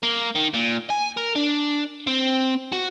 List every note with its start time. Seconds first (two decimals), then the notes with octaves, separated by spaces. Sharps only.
0.03 A#3
0.36 D#3
0.54 A#2
0.90 G#5
1.17 A#4
1.35 D4
2.07 C4
2.72 F#4